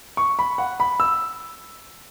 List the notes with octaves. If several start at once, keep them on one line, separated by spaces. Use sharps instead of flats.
C#6
B5
F#5
B5
E6